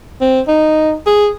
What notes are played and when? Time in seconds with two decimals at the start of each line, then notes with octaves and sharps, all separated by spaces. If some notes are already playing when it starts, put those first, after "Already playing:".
0.21 C4
0.48 D#4
1.06 G#4